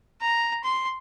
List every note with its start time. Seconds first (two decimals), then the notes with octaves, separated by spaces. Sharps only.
0.21 A#5
0.64 C6